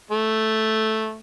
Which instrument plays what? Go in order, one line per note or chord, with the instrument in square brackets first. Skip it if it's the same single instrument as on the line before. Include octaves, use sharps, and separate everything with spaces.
[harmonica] A3